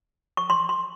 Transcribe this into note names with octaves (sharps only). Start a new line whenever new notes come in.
C#6
C6
C6